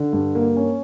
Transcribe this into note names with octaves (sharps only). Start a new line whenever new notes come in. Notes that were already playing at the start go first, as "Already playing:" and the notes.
Already playing: D3
G2
A#3
C#4